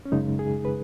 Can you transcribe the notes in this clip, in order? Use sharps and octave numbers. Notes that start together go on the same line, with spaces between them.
C#4
F#2 C#3 G#3 D#4
G#4
B4